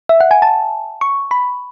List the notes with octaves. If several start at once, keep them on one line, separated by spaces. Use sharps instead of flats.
E5
F#5
G#5
A5
C#6
B5